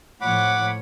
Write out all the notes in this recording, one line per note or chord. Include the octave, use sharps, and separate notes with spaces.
A2 F3 C#5 F#5 B5 D6